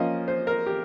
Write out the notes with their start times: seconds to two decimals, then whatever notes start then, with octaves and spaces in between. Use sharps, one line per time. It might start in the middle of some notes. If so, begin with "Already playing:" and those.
Already playing: F3 A#3 C#4 D#5
0.28 C5
0.47 A#4
0.66 G4